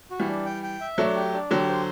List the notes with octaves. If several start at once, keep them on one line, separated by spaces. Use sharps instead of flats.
F#4
E3 G3
D4
G5
G5
E5
F#3 A3 D4
G4
D4
D3 F#3 G4
C5